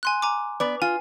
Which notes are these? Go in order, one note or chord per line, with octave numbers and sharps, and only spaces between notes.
G#5 C6 F#6
G#5 A#5 D6
B3 B4 D5
F4 G#5